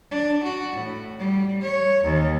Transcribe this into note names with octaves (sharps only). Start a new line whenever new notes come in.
D4
F#4
A2
G3
C#5
D#2